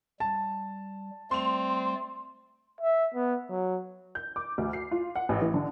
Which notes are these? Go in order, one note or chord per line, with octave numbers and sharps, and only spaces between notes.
G3 A5
G3 A3 C4 D5 C6 F7
E5
B3
F#3
G6
D6
D2
C7
F4
F#5
A1
E3
D3